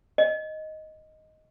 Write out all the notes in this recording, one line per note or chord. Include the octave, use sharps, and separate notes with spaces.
D#5